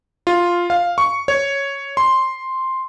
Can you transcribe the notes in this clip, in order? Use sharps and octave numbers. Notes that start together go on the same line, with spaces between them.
F4
F5
C#6
C#5
C6